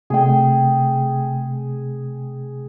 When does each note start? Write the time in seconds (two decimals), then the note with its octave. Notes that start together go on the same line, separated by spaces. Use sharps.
0.10 C3 A3 G#4 G5